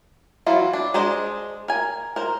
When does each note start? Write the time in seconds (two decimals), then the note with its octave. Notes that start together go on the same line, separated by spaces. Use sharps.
0.47 E3 F#3 E4 F4
0.73 D4
0.94 G#3 D4 C5 D#5
1.68 A#4 G#5
2.16 A#4 C5